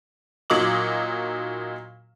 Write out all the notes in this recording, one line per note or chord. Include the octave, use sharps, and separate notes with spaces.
A#2 F#3 D#4 D6 F#7